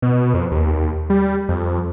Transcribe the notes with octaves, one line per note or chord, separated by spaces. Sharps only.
B2
F2
D#2
G3
F2